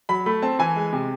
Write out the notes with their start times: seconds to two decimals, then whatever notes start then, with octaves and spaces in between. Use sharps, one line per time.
0.09 F#3 B5
0.26 A3 B5
0.42 C4 A5
0.59 E3 G#5
0.76 G#3
0.93 C3